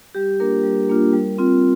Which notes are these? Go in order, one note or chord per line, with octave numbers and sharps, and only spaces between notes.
G3 G4
A#3 D4 F4 A#4
G3
A#3 D4 F4
G3
C4 F4